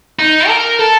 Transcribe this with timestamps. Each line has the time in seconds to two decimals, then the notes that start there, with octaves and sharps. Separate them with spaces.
0.19 D#4
0.48 A#4
0.79 A4